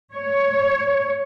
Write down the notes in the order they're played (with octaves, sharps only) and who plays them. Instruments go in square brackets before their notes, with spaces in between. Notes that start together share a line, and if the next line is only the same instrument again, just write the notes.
[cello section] C#5